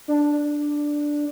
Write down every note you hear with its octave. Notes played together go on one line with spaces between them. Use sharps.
D4